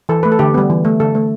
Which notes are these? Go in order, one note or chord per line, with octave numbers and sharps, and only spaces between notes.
E3 A4
A3 B4
A4
D3 G4
G3 B3
E3
A3
D3 A4
A3